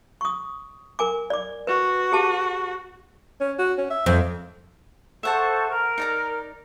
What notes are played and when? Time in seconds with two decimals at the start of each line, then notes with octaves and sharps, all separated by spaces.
0.21 C#6 D#6
0.99 A#4 G#5 D6
1.30 D5 D6
1.67 F#4 B4
2.12 G4 G#4 A5
3.41 C#4
3.59 F#4
3.78 C#4
3.90 E5
4.06 F2 C4
5.23 A4 C5 E5 F#5 A5 C#6
5.69 A#4
5.98 D#4 D5 A#5